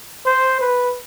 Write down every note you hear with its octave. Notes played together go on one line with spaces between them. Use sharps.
C5
B4